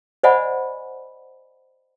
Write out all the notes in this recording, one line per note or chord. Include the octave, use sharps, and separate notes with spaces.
C5 D5 D#5 F#5 G#5 B5